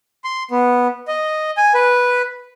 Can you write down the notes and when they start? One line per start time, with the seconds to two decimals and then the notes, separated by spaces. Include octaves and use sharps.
0.24 C6
0.51 B3
1.08 D#5
1.57 G#5
1.74 B4